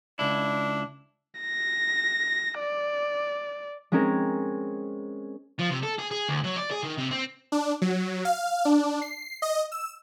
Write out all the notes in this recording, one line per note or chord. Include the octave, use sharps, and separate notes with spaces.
C#2 D4 E4
A#6
D5
G#3 C4 C#4 G#4 A#4
F3
C3
A4
G#4
G#4
D2
F#3
D5
G#4
D#3
C3
C4
D4
F#3
F5
D4
C7
D#5
E6